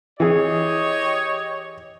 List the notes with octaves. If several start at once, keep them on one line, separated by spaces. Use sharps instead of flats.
E3 G4 G#4 C#5 D#5